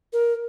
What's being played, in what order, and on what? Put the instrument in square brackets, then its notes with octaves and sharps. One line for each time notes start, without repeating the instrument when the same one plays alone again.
[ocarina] A#4